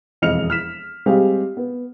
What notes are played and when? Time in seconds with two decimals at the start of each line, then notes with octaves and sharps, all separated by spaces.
0.22 E1 F2 D#5 F6 C#7 F7
0.50 F6 B6 E7
1.06 G3 G#3 C4 G4 G#4 F5
1.57 B3